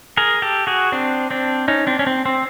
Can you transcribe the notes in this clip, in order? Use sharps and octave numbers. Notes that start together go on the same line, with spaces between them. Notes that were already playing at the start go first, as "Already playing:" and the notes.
G#4 A#4
G4 A4
F#4 G#4
C4 D4
C4 D4
C#4 D#4
C4 D4
C#4
C4
C4